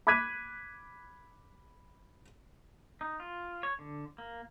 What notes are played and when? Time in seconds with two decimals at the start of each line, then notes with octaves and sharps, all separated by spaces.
0.07 B5 D6 F#6 G#6 B6 D#7
3.01 D#4
3.20 F4
3.63 C#5
3.79 D3
4.18 A#3